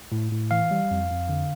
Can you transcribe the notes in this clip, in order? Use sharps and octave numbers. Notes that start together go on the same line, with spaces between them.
A2
A2
E3 F5
G3
F2
F2
D3